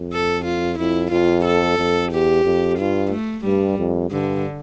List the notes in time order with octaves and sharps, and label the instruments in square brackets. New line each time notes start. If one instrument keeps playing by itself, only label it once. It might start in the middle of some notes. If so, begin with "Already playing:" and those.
Already playing: [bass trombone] F2
[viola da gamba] A4
F4
[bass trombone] F2 [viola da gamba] E4
[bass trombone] F2 [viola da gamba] F4
[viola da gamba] A4
[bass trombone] F2
[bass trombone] E2 [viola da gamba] G4
[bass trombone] F2
[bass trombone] G2 [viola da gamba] F4
[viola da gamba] A3
[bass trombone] G2 [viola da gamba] G3
[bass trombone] F2
[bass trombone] G2 [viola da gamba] D3